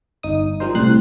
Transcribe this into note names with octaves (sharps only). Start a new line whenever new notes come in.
G1 D#4 D#6
F3 G3 A#4 C5
C2 A2 G3 C4 F#6 C7